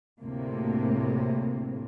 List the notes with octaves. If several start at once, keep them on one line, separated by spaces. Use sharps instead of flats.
D2 A2 C3 A#3